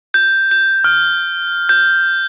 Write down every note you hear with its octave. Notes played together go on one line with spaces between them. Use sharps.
G6
G6
F6
G6